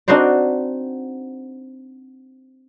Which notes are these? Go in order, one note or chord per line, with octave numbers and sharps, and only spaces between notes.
C4 D4 D#4 F#4 C5 D5